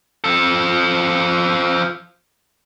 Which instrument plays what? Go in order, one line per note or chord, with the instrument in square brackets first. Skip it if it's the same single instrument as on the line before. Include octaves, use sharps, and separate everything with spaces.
[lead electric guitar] F3 A4